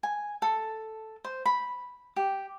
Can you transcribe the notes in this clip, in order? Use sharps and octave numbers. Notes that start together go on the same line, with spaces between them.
G#5
A4
C5
B5
G4